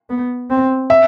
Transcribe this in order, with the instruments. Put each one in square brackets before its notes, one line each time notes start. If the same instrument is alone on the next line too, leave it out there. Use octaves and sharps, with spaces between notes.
[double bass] B3
C4
[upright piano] E5